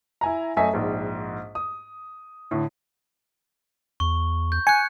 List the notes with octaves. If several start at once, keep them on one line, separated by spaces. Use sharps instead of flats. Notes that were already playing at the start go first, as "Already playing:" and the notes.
E4 G#5 A#5
F#2 A3 D#5 E5 G#5 B6
A#1 G#2
D#6
A2 D3
E2 C#6
G6
G#5 F#6 C#7